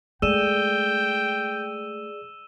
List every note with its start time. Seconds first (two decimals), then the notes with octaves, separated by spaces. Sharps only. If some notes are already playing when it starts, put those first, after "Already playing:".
0.22 G#3 A3 G#4 D5 G5 E6 D#7 E7